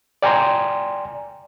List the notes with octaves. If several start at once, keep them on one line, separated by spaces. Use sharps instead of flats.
D5 G5 G#5 A#5 C6